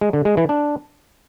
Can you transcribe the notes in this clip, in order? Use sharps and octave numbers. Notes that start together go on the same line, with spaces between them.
G#3
D3
G#3
E3
D4